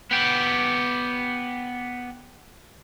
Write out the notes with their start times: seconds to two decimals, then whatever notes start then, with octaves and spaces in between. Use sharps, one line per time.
0.11 B3 G4